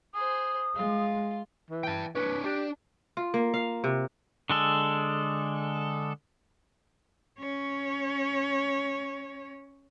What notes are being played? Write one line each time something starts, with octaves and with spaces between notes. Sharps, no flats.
G#4 C5 D#6
G#3 F4
E3
G5 A5
D4 B4 C#5
D4 G4
F4
A#3
F5
C3
D3 G#3 A4
C#4 C#5